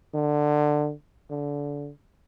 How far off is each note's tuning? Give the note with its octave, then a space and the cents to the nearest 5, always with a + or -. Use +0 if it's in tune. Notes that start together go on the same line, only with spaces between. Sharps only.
D3 +15
D3 -25